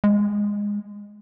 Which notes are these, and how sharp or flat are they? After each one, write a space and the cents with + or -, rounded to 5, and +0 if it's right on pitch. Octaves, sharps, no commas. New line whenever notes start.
G#3 -15